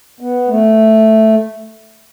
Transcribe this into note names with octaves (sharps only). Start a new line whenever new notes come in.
B3
A3